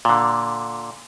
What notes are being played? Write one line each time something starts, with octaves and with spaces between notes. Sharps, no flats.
A#2 D3